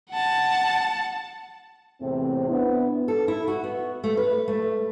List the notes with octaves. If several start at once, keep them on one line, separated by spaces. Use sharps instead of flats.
F#5 A5
E2 A2 C3 C4
B3 D4 E4
A4
E4
F#4
B3
A3
B4
A3